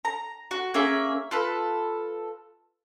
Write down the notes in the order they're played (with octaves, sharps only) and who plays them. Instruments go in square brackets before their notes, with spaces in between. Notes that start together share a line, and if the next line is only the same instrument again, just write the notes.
[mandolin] A#5
F#4
A#3 C#4 G#4 E5
F4 A4 B4